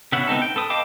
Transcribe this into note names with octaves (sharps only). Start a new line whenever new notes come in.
C#3 B3 E4 F#5
B3 C4 D#4 A4
G5
A4 B4 D#6
D#5 F5 G5 A5 D6